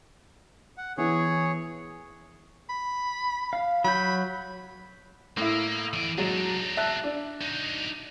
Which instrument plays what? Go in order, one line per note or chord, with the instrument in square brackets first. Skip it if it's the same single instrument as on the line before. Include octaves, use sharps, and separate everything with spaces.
[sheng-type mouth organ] F#5
[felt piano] E3 B3 E4 [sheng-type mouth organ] G#4 C#5
[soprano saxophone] B5
[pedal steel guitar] F5
[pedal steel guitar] F#3 G6 [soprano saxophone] B5
[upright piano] A2 E4 [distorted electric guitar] A#3
[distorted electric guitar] E3 D5 [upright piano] D#7
[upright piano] F#3 G#3 [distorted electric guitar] D4 D#4
[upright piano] E5 A5 F#6
D4
[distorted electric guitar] D#4 F#4